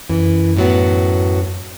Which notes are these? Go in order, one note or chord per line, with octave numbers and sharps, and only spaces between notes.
F#2 E3
A2 F#3 B3